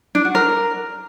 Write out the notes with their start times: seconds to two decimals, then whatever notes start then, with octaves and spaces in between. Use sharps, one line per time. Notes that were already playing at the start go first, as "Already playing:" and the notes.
0.15 D4
0.25 F#4
0.35 A#4